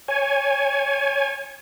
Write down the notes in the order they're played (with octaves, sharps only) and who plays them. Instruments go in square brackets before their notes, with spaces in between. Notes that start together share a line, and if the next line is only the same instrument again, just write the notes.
[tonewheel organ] C#5 G#5